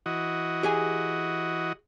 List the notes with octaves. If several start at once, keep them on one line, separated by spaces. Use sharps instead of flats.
E3 F#4 D#5
G4 G#4 G#5